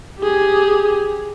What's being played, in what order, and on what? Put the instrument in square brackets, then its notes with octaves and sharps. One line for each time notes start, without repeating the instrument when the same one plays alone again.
[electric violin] G4 G#4